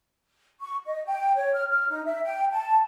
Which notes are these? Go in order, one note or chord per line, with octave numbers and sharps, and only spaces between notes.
C#6
D#5
G5
C#5
F6
F6
D#4
E5
G5
A5